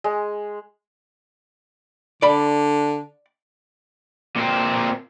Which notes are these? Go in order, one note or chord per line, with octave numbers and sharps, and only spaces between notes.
G#3
D3 D5 B5
A#2 C4